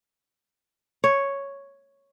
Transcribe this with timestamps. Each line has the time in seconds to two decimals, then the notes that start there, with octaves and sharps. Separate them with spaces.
1.04 C#5